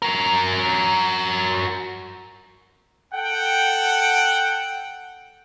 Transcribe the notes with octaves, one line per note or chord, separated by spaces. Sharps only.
F#4 A#4
A4 F#5 G5